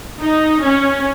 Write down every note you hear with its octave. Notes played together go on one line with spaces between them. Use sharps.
D#4
C#4